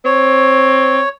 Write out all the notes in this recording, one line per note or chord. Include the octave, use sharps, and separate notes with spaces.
C4 C#5